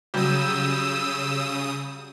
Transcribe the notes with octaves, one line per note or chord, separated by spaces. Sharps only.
C#3 F#3 G3 G4 D#6 E6